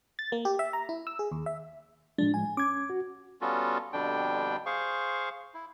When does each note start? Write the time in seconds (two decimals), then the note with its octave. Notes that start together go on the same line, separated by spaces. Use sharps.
0.19 A6
0.32 A#3
0.45 G4
0.59 E5
0.73 A#5
0.89 E4
1.07 E6
1.19 G#4
1.32 D#2
1.46 E5
2.18 A2 F3 G#3 D4
2.34 G#5
2.57 C#4 D6 G#6
2.90 F#4
3.41 G3 B3 C#4 F4 F#4 A4
3.93 F2 B2 D3 G3 D4 G5
4.66 G#4 C5 F5 C#6
5.54 E4